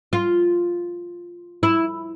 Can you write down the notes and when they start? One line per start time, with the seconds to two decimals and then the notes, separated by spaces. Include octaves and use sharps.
0.13 F4
1.63 E4